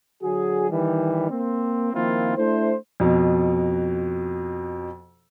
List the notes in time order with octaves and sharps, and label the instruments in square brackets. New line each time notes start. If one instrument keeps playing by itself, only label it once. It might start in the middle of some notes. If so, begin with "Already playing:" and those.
[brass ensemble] D3 F#3 F#4 G#4
D#3 E3 G3
A#3 C4
D#3 F3 A#3 C4 E4 F4
A3 D4 E4 C5
[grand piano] F2 B2